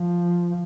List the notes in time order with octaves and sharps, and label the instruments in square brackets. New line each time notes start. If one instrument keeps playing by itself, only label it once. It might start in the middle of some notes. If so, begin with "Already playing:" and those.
Already playing: [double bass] F3